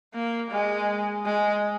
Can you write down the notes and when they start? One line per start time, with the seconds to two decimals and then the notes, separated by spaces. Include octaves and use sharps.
0.14 A#3
0.51 G#3
1.25 G#3